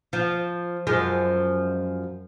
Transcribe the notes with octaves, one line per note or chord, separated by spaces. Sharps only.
F3
F#2 F3 G#3